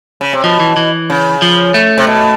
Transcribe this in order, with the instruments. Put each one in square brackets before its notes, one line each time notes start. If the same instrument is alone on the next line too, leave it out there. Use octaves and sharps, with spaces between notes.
[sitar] C#3
C3
[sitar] B2 [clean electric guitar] F3
[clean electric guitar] E3
E3
[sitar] C#3
[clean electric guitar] F3
A3
[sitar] C3
B2